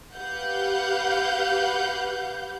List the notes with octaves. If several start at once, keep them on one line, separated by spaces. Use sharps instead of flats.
G4 B4 F5 F#5 G6